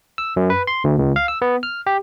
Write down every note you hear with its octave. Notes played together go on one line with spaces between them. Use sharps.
E6
F#2
B4
C6
D2
C#2
F5
E6
B3
F6
G4